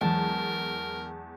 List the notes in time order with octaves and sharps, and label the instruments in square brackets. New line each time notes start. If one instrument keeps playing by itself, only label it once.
[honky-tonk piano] E2 [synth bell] E3 F#3 G#3 [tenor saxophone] A#4 [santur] A5